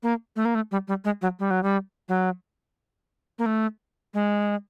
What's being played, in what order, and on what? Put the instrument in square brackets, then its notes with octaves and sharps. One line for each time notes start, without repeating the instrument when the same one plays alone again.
[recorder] A#3
A3
A#3
A3
G3
G3
G#3
F#3
G3
F#3
G3
F#3
A#3
A3
G#3